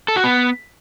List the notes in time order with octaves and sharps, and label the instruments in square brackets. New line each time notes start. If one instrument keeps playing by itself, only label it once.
[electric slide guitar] A4
F#4
B3